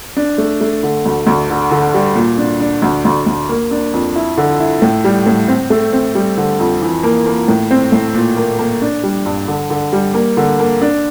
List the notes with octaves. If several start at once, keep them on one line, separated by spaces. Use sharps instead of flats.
D4
A3
A3
D3
D2
D2
D3
D3
G3
A#2
D4
D4
D2
D2
D2
A#3
D4
F2
E4
D3
E4
A2
G3
A2
C4
A3
C4
G3
D3
F2
E3
A#3
A#3
A2
C4
A2
A#2
A#3
A#3
D4
G3
G2
D3
D3
G3
A#3
D3
A#3
D4